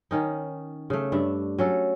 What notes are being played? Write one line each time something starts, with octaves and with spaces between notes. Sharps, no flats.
D#3 C#4 D#4
C#3 A3
G2 D4 E5
F#3 C#4 A4